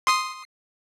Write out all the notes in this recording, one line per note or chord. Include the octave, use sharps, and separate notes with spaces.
C6 D#6 C7